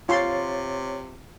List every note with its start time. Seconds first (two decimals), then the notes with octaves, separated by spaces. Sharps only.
0.09 C3 F4 C#5 C6 A6